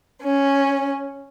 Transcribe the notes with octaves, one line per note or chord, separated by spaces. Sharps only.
C#4